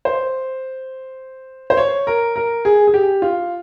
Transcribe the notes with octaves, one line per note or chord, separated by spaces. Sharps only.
C5
C5
C#5
A#4
A#4
G#4
G#4
G4
F4